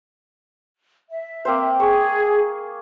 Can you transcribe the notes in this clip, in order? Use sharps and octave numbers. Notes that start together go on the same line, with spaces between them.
E5
A#3 C4 C5
G#4 C#6